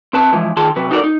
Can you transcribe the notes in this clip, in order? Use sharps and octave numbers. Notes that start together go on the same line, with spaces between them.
C4 B4 A5
E3 F3 G#3 E4
D#3 F4 G#4 A5 C6
C3 F#3 B4
D#4 F#4 A4 A#4 D5
D#4